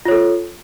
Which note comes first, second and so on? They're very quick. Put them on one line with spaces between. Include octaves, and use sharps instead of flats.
F4 C#5 A4